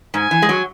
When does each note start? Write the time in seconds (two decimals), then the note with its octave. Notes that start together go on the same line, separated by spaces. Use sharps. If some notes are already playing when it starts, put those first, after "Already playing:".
0.14 G#2 G#5
0.31 E3
0.42 G#3
0.49 F#3